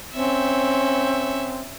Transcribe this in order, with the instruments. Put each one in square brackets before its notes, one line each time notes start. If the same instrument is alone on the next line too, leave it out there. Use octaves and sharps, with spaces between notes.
[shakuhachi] C4 [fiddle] C#4 E5